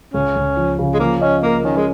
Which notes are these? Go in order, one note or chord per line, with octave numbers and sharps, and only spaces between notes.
C#2 C#4
C#2
F3
C#3
G#3
F3 A#3
C#4 D#5
A#3 A#4
D#3 C#4
G#3